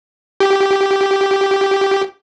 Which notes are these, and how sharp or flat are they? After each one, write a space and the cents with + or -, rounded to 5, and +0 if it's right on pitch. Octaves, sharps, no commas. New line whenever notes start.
G4 -5